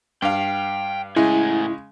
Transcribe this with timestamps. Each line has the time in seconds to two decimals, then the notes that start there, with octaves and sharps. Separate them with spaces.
0.22 G2 F5 G5
1.16 A2 C#3 G#3 E4 G#5